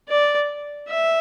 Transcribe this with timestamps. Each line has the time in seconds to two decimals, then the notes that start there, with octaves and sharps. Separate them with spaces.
0.09 D5
0.88 E5